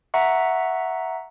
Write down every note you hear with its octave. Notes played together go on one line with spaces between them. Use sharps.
E5 F#5 A#5 C#6